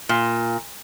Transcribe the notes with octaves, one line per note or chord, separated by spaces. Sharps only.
A#2